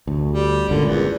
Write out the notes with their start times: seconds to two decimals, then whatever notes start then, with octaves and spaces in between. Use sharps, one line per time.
0.07 D2
0.31 G3
0.69 G1 C#2 A#2 D3
0.86 E2